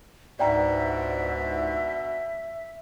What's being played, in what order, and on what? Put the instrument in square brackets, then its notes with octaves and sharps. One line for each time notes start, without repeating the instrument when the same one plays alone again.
[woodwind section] C#2 G#2 [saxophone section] B2 D4 [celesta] D5 G5 A#5 [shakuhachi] E5